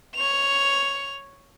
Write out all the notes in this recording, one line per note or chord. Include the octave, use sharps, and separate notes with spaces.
C#5 F7